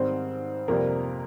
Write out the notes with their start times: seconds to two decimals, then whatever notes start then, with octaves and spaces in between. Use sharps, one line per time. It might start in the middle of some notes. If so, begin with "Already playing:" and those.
Already playing: G#2 D#3 G3 C4 C5
0.68 F2 C3 G3 A#3 A#4